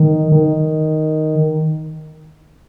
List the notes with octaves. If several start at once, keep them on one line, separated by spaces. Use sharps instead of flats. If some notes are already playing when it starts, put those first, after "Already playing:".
Already playing: D#3
D#3